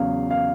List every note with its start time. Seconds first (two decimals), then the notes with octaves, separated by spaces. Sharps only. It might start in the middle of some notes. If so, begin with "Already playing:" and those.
Already playing: E2 C#3 F#3 F5
0.31 F5